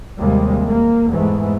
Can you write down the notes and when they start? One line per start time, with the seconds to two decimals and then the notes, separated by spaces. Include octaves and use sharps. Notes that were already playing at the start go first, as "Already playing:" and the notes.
0.19 D#2 C3 G3 G#3 A#3
0.69 A#3
1.10 E2 G#2 E3 A3